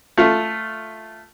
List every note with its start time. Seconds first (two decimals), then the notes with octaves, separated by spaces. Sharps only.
0.17 A3 F4